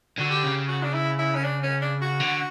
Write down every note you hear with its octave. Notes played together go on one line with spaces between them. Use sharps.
D3 F#4
G4
C#3
F#4
D4
E4
E4
C#4
D4
C#4
D4
F#4
D3